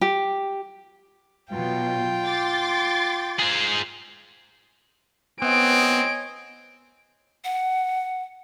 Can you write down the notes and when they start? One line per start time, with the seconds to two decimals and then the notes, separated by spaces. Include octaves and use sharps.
0.01 G4
1.52 B2 F#3 F4 G5
2.25 C6 D6 A6
3.39 G#4 C5 F5
5.42 B3 C4 C#5 D#5 G#5 D7
7.44 F#5